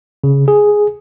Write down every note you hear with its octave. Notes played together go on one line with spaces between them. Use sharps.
C#3
G#4